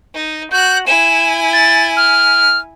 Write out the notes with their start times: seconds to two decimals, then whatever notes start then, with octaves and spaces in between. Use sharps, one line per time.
0.15 D#4
0.52 F#4 F#6 G6
0.87 E4 G#5 E7
1.53 A6
1.97 F6